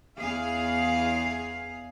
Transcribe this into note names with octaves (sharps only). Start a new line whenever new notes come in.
E2 G#4 F5